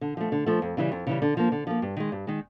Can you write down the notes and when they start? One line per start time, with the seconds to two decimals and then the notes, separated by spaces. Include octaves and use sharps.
0.01 D3
0.17 F3 A3
0.32 D3
0.46 F3 A3
0.62 F2
0.77 C#3 E3 G3
0.92 F2
1.07 C#3 E3 G3
1.22 D3
1.37 F3 A#3
1.52 D3
1.67 F3 A#3
1.82 G2
1.97 D#3 G#3
2.12 G2
2.27 D#3 G#3